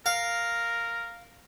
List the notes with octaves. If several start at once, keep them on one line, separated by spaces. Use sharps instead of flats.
A#4 F5